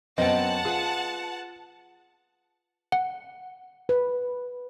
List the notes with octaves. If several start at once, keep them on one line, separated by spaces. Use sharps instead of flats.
F#2 B3 C4 D#5 F#5 G5 A5
F4 G#4 B4
F#5
B4